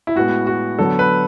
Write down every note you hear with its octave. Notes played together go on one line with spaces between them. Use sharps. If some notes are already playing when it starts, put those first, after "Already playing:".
E4
A2 G#3 B3 F#4
F#4
D3 F#3 B3 A4
B4